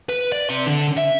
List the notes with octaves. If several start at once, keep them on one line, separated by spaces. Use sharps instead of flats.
B4
D5
C3 C6
D3
E5